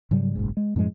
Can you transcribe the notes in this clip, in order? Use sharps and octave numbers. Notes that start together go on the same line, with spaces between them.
G#2 C#3 F#3 G3
F#1 B1 G#2
G#3
F#2 A2 F3 G#3